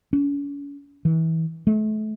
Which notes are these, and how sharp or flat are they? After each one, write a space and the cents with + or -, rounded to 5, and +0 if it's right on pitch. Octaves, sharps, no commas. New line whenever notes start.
C#4 +40
E3 -30
A3 -35